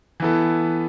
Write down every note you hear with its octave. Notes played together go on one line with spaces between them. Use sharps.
E3 B3 E4 A4